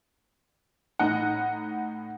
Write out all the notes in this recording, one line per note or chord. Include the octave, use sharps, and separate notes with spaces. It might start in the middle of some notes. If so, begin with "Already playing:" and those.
A2 D#4 F#5